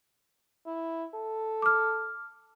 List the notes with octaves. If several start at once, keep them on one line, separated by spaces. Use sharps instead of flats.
E4
A4
D6 F6